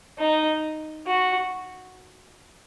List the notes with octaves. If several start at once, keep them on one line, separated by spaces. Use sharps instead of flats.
D#4
F#4